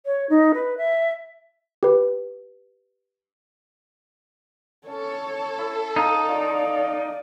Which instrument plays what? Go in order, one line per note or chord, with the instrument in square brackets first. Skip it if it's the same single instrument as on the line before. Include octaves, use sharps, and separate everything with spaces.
[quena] C#5
D#4
B4
E5
[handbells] G4 B4
[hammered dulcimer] C#4 [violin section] A4 [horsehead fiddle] C#5
[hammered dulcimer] E4
[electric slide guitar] D#4 [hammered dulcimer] F4
[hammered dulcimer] F4 [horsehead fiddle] D5